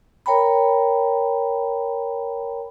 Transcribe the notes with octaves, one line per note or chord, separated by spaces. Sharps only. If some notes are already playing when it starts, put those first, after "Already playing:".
A#4 C#5 G5 A#5 B5